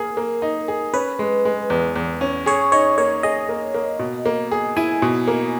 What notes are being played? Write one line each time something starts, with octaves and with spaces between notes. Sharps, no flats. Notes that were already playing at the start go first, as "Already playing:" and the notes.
Already playing: A#3 G#4 A#4
A#3
D#4
G#4
C#4 B4
G#3
G#3
E2
E2
C#4
G#4 C#5
D#4 C#5
A#3 C#5
G#4 D#5
A#3
A#3
B2
A#3
G#4
E4 G#5
B2
A#3